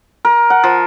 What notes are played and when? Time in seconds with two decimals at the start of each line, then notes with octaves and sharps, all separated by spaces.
0.25 A#4
0.50 F#5
0.63 F3